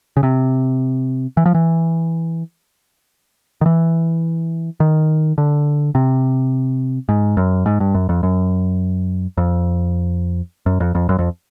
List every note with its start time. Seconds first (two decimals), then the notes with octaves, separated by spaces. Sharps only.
0.17 C#3
0.23 C3
1.37 E3
1.46 F3
1.55 E3
3.61 D#3
3.66 E3
4.80 D#3
5.38 D3
5.95 C3
7.09 G#2
7.37 F#2
7.66 G#2
7.80 G2
7.95 F#2
8.09 F2
8.23 F#2
9.37 F2
10.66 F#2
10.80 F2
10.95 F2
11.09 F#2
11.19 F2